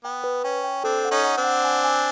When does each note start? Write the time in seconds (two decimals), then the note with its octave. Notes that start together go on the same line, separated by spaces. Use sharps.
0.04 B3 G5
0.24 B4
0.44 C#4 G5
0.64 G5
0.84 C4 D4 A4
1.05 F#5
1.11 C#4 D#4
1.24 F#5
1.38 C4 D4
1.44 F#5
1.64 G#5
1.84 G#5